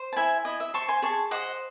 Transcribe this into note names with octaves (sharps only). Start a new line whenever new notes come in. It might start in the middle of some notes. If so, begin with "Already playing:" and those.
Already playing: C5
A5
E4 E5 G#5
E4 D#5
E5
C5 A5 C#6
G#5 C6
G#4 A5 C#6
C5 D#5 F#5